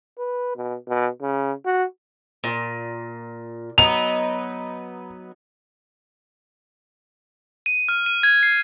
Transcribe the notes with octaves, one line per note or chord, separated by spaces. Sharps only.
B4
B2
B2
C#3
F#4
A#2
F#3 B3 D#4 F7
D#7
F6
D#7
G#6
C7